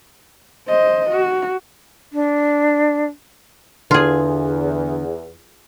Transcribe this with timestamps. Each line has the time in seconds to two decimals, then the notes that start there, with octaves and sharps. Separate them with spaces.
0.68 C5 D#5
1.10 F#4
2.13 D4
3.91 E2 D3 F4 G#4